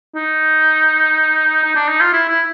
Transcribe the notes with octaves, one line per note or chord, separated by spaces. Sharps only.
D#4
D#4
D4
D#4
F4
E4
E4